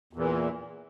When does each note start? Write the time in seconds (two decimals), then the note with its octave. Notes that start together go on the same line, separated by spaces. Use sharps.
0.13 E2
0.16 A#2
0.19 E3